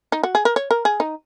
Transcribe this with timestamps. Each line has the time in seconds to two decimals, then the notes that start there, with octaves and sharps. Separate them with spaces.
0.12 D#4
0.23 F#4
0.35 G#4
0.45 A#4
0.56 C#5
0.71 A#4
0.85 G#4
1.00 D#4